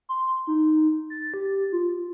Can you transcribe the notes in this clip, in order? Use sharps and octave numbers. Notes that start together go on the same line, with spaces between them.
C6
D#4
A6
G4
F4